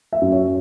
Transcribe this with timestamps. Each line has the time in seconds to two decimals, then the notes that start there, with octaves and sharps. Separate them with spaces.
0.13 E5
0.21 F#2
0.32 C#5